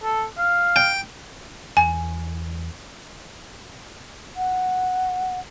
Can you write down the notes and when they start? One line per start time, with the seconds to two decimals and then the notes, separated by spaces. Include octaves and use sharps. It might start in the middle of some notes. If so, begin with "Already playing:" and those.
0.03 A4
0.38 F5
0.76 G5
1.77 E2 G#5
4.37 F#5